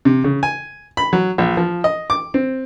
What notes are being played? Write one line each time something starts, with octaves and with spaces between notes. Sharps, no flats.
C3
C#3
G#5
B5
F#3
A#1
F3
D#5
D6
C4